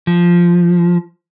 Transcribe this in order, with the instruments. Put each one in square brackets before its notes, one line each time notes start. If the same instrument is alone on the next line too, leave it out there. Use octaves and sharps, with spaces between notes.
[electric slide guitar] F3